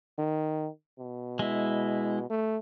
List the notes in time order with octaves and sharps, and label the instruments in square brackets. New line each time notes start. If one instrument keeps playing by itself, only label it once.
[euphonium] D#3
B2
[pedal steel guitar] G#3 E4
[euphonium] A3